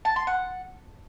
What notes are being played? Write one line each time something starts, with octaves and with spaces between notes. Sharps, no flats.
A5
C6
F#5